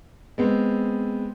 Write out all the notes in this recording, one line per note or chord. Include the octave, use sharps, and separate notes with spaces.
G#3 B3 C4